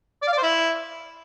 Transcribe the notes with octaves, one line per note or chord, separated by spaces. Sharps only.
D5
F5
D5
C5
E4